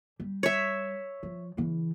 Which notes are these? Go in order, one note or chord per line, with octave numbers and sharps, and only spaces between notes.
G3
C#5 E5
F3
C#3 E3